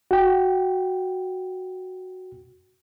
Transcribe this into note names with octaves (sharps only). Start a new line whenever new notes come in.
F#4 G5